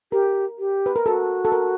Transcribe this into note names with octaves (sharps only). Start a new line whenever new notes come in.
G4 A#4
G4
B4
A#4
F#4 A4
A4
A#4